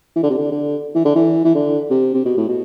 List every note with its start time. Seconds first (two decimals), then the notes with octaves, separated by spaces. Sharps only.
0.16 E3
0.23 D3
0.30 C3
0.37 D3
0.51 D3
0.95 E3
1.05 D3
1.15 E3
1.44 E3
1.54 D3
1.91 C3
2.14 C3
2.25 B2
2.37 A2
2.48 B2